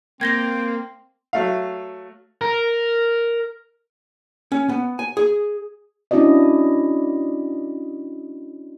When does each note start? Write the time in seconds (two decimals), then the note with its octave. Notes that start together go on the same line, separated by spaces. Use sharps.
0.21 A#3 C4 G5 G#6 A#6 G7
1.33 F#3 A3 F5
2.41 A#4
4.52 C#4
4.69 B3
4.99 G#5
5.17 G#4
6.11 C#4 D4 E4 F#4 D5 D#5